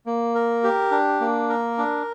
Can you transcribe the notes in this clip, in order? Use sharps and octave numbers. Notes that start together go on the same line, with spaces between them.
A#3
A#4
G4
D4
A#3
A#4
D4